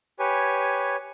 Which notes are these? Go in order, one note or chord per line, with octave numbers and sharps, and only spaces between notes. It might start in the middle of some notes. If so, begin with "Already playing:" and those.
G4 B4 C#5 G#5